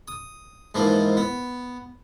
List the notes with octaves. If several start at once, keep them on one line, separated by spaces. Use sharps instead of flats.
D#6
G#2 E3 F3 A#3
B3